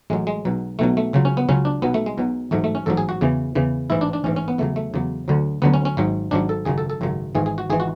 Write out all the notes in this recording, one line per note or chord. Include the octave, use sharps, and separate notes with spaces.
A1 A2 F#3 G#3
G#3
B1 B2 F#3
B1 B2 F#3 A3
A3
C#2 C#3 F#3
C#4
B3
C#2 C#3 F#3 C#4
D4
B1 B2 F#3 B3
A3
G#3
B1 B2 F#3
A1 G#2 F#3 A3
A3
C#4
A1 G#2 F#3 A4
G#4
F#4
E2 C#3 E3
E2 C#3 E3
A1 G#2 E3 E4
D4
D4
A1 G#2 E3 C#4
C#4
B3
E2 C#3 F#3 A3
A3
E2 C#3 F#3
D2 D3 F#3
D2 D3 F#3 B3
C#4
C#4
G#1 G#2 F#3
G#1 G#2 F#3 D4
A4
G#1 F#2 C#3 F#3 G#4
A4
A4
G#1 F#2 C#3 F#3
G#1 G#2 E3 G#4
G#4
F#4
G#1 E3 G#4
F#4